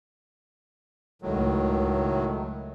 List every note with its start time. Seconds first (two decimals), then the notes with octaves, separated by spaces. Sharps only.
1.22 C#2 A2 D#3 F#3 A3